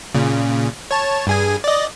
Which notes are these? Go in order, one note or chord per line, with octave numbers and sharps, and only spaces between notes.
A#2 C#3
C#5 A5
G2 G#4 G#5
D5 D#5